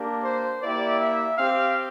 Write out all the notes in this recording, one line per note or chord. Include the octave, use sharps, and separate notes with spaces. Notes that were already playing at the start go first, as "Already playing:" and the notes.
Already playing: A#3 D4 G4
C5
A#3 E4 G4 D5
E5
C4 G4 F5